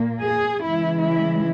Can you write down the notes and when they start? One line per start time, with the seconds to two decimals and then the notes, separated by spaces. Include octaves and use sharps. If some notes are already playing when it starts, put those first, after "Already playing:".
Already playing: A#2 A#3
0.22 G#4
0.62 C#3 E3 G#3 E4
1.01 E4